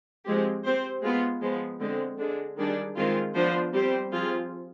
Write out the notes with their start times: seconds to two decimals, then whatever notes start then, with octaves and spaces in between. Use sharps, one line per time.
0.25 F3 G#3 C4 G4
0.64 C4 G4 C5
1.03 G#3 B3 F4
1.42 F3 G#3 B3
1.81 D3 G#3 C4
2.19 D3 G#3 D4
2.57 D#3 G3 D4 G#4 D5
2.97 D#3 G#3 C4 F4
3.35 F3 B3 D4 F4 C5
3.74 G3 C4 G4 C5
4.13 F3 C4 F4 G#4